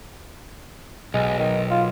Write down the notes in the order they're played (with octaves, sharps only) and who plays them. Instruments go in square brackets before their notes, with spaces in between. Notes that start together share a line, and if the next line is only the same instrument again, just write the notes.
[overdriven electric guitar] B1 [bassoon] G#3
[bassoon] D#3
F4